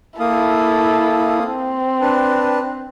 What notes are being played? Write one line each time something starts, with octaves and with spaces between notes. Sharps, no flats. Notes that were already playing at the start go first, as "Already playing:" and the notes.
A#3 E4 A4 F5 D#6
C4
D4 B4 A5